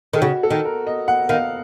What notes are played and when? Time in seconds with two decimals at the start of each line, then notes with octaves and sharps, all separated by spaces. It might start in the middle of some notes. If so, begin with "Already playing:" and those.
0.13 D#3 A4
0.22 C#3 F#4
0.43 A4
0.50 D#3
0.65 A#4
0.87 D#5
1.08 F#5
1.29 D#3 F5